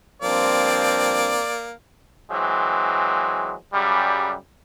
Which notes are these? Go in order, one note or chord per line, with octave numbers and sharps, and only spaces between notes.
G2 F3 A#3 C4 D5
E3 F#3 G#3 C4
F#2 C#3 G3